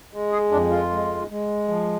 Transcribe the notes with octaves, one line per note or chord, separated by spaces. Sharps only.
G#3
G#4
F2 D4
F4
G#3
G#3
F3